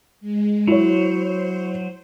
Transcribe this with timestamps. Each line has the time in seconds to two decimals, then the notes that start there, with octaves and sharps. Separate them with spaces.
0.21 G#3
0.68 F#3 E4 C5 C#5